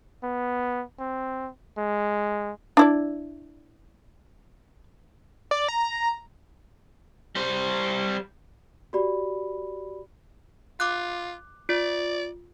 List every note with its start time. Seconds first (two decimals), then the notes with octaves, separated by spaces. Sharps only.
0.23 B3
0.99 C4
1.77 G#3
2.77 D4 E4 D5
5.51 D5
5.68 A#5
7.35 G3 C5
8.93 F#4 G4 D5 B5
10.80 F4 D6 F#6
11.69 F4 D5